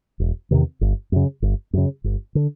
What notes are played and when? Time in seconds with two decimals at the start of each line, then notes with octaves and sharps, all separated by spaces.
0.20 E1
0.51 E2 C3 D#3
0.81 G1
1.12 F#2 C#3
1.42 G1
1.73 F#2 C#3
2.04 G1
2.35 D3